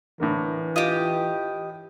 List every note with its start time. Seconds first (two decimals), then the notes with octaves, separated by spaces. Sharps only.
0.20 A2 D3 E3 A#3
0.76 F4 G4 D#5